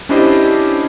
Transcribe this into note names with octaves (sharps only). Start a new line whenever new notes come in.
C#4 D4 E4 G4 C5 D#5